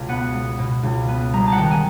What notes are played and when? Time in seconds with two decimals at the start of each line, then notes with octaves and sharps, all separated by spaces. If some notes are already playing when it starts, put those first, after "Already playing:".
Already playing: C#2 B2
0.08 B3 F#5
0.34 G#3
0.59 B2
0.83 C#2
1.08 B3
1.33 G3 A#5
1.46 A5
1.52 F#5
1.58 D#3 G5
1.71 G#5